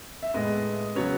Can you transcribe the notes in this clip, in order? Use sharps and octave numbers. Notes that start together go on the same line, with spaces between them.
E5
A2 G#3 B3 D#5
C#3 F#3 B3 C#5